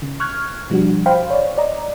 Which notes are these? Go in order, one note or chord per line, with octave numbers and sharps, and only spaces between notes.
C#3
C#6 F6 F#6 G#6
B2 F3 G3 D4 F#4
C5 F5 G5 B5
C#5 D5
D5 D#5 A#5